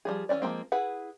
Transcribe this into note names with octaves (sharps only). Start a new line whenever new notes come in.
F3 G3 G#4
E3 C4 C#4 D5
F3 F#3 G#3 A#3 C4
E4 G#4 B4 F#5